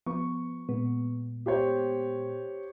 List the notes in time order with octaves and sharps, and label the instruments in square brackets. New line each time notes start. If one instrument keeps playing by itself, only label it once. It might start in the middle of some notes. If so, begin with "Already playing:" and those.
[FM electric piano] F3 B3 [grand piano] C#6
[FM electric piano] A#2 G#3 B3
[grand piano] G4 C5 C#5